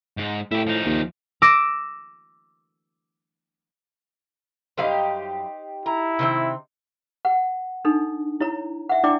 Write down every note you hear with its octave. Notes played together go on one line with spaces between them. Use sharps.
G#2 G#3
A2 E4 G4
F3 D#4
D#2
D6 E6 A#6 D7
F#2 G3 D#4 G4 C5 F5
E4 A#5
C3 D#3 C4
F#5
D4 D#4 A4
E4 C#5 A#5
E5 F#5
D4 E4 D5 G5 D6